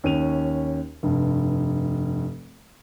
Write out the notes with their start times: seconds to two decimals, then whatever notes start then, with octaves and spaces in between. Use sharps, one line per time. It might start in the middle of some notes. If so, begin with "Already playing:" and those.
0.04 D#2 C#4 C#5 D#7 F7
1.03 F1 G2